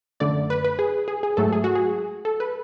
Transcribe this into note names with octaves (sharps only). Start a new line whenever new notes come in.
F#2 D3 A3 D5
B4
B4
G#4
G#4
G#4
G#2 F#3 A3 A4
G#4
F#4
G#4
A4
B4